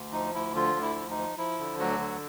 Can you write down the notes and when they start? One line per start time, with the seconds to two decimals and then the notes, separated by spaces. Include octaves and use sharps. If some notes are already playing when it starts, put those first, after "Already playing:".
Already playing: D2
0.12 F3 D#4
0.34 D2 E4
0.54 D3 F3 F4
0.75 D2
0.82 E4
0.96 F3
1.10 D#4
1.18 F3
1.37 F3 E4
1.59 D3
1.79 D2 F#3 F#4
2.00 D3